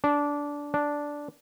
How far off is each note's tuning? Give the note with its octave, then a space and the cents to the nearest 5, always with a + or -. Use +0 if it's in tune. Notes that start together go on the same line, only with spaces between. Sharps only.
D4 -15
D4 -5